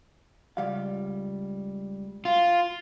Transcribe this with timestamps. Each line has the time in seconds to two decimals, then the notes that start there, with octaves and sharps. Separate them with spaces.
0.57 C#2 G3 F5
2.25 F4